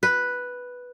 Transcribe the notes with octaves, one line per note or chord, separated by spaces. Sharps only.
B4